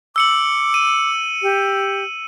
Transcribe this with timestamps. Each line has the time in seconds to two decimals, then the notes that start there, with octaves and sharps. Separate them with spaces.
0.16 D6 E6 C#7 F#7
0.74 D#7
1.42 G4